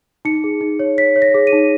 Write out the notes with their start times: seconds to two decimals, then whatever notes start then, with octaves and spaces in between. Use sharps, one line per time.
0.25 D#4 C#7
0.44 G#4
0.61 D#4
0.79 C#5
0.98 C#5 B6
1.16 C#5
1.22 A#6
1.34 G#4
1.47 D#7
1.53 D#4